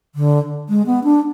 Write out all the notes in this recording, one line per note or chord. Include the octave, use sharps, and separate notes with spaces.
D3
G#3
B3
D4